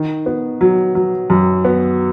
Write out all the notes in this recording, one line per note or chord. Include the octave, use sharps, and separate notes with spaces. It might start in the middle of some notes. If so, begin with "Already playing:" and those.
Already playing: D#3
B3
F#3
F#3
F#2
B3